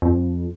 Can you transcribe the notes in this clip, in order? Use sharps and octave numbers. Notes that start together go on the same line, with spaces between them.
F2